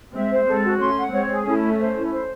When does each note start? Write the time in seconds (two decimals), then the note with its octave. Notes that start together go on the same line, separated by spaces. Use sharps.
0.14 G#3 C4 E5
0.31 C5
0.47 G#3 C4 A4
0.63 F#4
0.80 A3 C#4 C6
0.97 F#5
1.13 G#3 C4 C#5
1.30 G#4
1.46 A3 C#4 E4
1.63 E5
1.79 C5
1.96 E4
2.12 C5